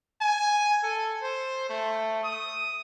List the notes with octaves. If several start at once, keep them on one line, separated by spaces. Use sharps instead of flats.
G#5
A4
C5
A3
D#6